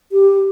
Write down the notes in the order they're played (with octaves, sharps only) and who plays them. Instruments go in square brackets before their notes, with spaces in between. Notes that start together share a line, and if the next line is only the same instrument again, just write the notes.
[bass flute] G4